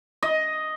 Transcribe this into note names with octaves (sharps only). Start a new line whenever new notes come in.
D#5